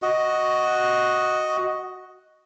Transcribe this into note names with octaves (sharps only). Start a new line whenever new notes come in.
F#4 D#5